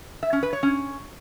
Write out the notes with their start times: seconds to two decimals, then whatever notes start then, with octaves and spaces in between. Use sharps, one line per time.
0.23 E5
0.33 C#4
0.43 B4
0.53 C#5
0.63 C#4